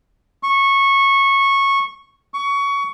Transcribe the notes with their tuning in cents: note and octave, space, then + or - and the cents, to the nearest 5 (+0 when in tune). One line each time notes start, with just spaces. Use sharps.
C#6 -15
C#6 +20